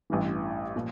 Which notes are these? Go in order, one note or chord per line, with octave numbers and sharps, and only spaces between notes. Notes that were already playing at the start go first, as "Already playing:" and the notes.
A1 G2 E3
A#2 F3